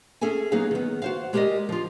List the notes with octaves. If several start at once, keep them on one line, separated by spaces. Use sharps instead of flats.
C#4 G#4 A4 E5 G#5
F#3 A#3 B3 D#4 G#4 F5
D#3 B3
F#4 C5 F5
G#3 G4 A#4 C5 D5 D#5
F3 F4